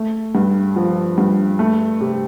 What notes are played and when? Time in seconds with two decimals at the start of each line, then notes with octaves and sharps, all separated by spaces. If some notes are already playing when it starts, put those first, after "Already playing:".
Already playing: A3
0.35 G2
0.76 F3
1.18 G2
1.59 A3
2.01 C3